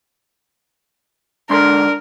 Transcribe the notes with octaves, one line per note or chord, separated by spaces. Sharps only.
G#2 D3 D4 A#4 C6